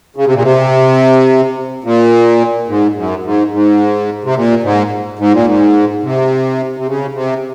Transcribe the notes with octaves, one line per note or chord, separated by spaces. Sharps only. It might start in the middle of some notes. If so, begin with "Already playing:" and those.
C#3
C3
A#2
C3
A#2
G#2
F#2
G#2
G#2
C3
A#2
G#2
G#2
A#2
G#2
C3
C3
C#3
C3